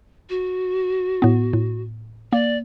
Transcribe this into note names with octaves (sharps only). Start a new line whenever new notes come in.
F#4
A2 B3
A2
A#3 D5